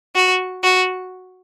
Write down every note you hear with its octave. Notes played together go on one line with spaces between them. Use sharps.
F#4
F#4